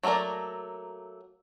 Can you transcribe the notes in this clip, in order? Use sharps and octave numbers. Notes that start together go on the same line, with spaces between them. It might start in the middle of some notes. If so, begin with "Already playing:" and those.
F#3 A3 A#3 A#4 D5